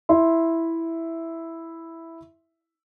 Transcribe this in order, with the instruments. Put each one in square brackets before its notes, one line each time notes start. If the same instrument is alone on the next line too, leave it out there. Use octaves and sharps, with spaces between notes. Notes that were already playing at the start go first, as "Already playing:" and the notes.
[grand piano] E4 E5 C6